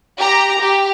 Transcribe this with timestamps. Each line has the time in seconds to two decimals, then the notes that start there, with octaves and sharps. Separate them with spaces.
0.19 G4 A#5
0.60 G4